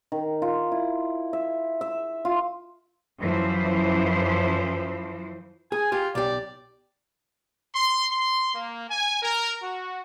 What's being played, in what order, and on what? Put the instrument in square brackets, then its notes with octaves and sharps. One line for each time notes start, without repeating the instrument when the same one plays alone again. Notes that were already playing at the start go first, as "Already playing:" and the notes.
[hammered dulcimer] D#3
F4
E4
E5
E5
F4
[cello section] F#2 E3 F3 C5
[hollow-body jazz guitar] G#4 [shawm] G#5
[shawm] F4 [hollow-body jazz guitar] G4
[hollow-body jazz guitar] B1 G4 [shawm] D5
[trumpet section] C6
C6
A#3
G#5
A#4
F#4